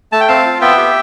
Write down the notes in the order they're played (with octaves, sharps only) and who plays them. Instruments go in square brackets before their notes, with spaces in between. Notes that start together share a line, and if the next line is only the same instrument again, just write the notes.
[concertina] A3 A5
G5
C4 F5 A5
F4
B3 E5 G5
G4